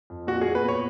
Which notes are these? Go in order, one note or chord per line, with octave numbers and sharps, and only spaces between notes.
F2
A#2 F#4
G#4
A#2
B4
B3 C#5